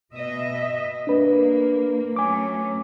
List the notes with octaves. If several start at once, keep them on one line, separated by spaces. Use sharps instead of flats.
B2 D#5 E5
A#3 D4 B4
F#3 A3 C#4 G#5 D6